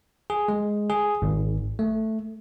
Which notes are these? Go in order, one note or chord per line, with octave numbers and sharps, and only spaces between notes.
G#4
G#3
G#4
G#1
A3